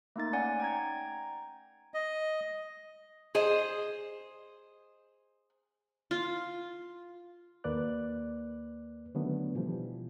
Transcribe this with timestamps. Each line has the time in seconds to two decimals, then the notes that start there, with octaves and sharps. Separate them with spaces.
0.16 A3 A#3 D#4 A6
0.33 C#4 D5 F#5 G#5
0.60 G5 A#5 G#6
1.94 D#5
3.35 G#4 C5 D#5
6.11 F4
7.64 D#2 A#3 B4 D5 F#6
9.15 D3 D#3 F#3 A3 B3 D4
9.55 B2 E3 F3 G3